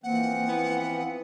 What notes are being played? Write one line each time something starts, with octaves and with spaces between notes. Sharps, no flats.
E3 F3 A#3 C4 F#5
B3 E4